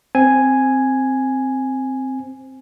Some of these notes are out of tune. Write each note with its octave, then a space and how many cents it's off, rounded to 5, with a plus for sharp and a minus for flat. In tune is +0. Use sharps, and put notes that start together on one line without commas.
C4 +0 G#5 +0